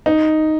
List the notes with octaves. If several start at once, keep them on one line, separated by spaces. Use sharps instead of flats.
D#4